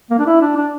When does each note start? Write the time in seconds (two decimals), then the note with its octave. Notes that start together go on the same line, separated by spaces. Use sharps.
0.10 A#3
0.19 D4
0.26 E4
0.41 D4
0.56 D4